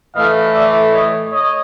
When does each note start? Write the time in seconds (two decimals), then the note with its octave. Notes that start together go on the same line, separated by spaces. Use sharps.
0.15 A2 E3 A3 D#5 F5
0.54 D5 E5
0.92 C#5 D#5
1.32 C#5 D#5